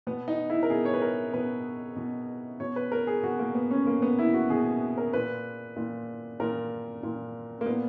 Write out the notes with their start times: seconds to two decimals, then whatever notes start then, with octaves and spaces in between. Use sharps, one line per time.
0.07 B2 B3
0.28 D#4
0.50 E4
0.63 A#4
0.70 B2 G#4
0.85 C#5
0.94 B4
1.02 A#4
1.33 B2 B4
1.96 B2
2.60 B2 C#5
2.76 B4
2.92 A#4
3.07 G#4
3.23 B2 F#4
3.39 A#3
3.55 B3
3.71 C#4
3.87 B2 A#3
4.02 B3
4.19 E4
4.34 F#4
4.50 B2 G#4
4.97 A#4
5.13 A#2 B4
5.76 A#2
6.40 A#2 A#4
7.03 A#2
7.61 A#3
7.66 A#2 B3